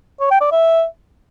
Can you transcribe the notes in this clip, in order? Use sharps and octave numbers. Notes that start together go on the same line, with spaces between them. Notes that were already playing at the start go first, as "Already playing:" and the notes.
C#5
G5
D5
E5